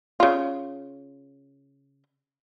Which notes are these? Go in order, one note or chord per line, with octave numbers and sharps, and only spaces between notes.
C#3 F4